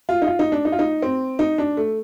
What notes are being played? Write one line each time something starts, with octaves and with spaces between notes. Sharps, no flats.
F4
D#4
F4
D#4
D4
D#4
F4
D#4
C4
D#4
D4
A3